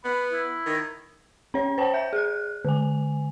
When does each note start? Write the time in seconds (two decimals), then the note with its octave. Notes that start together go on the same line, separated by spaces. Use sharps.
0.04 B3 B5
0.32 E4
0.66 D#3
1.54 C#4 C#5
1.78 C5 C#5 G5 A5
1.94 E5 G6
2.13 G#4 F#6
2.65 D3 G#5